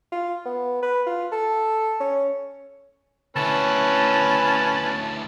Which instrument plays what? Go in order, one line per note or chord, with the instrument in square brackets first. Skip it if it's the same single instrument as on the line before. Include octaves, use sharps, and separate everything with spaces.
[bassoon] F4
B3
B4
F4
A4
C#4
[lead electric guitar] D2 E4 [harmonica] C#4 B4 [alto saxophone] A5